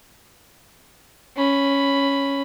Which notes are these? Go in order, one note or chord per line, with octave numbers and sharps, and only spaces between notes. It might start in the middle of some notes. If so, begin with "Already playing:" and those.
C#4 B5